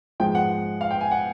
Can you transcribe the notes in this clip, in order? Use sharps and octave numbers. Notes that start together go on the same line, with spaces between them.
G#2 F3 G#3 G5
F#5
F5
G5
G#5
F#5